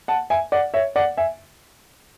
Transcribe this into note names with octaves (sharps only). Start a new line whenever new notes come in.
F#5 A5
E5 G#5
D5 F#5
C#5 E5
D5 F#5
E5 G#5